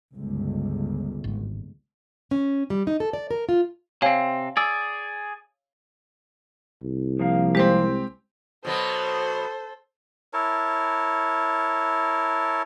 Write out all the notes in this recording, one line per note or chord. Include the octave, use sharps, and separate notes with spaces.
G1 C#2
G#1
C#4
G3
D#4
A4
D5
A#4
F4
C3 C4 C#5 F5 G#5
G#4 D5 E6
C2
F3 A#3 F5
G#3 C4 G4 C5
B2 F#3 B3 A4 C5
E4 A#4 C#5 A5